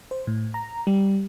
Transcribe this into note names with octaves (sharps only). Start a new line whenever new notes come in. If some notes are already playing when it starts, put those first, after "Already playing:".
C5
A2
A#5
G3